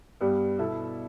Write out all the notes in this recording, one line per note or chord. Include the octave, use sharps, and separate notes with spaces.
G2 G3 B3 G4
B2 B3 E4 A4 E5